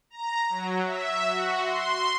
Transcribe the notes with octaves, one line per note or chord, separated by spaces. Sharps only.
A#5
F#3
E5
F#4
C6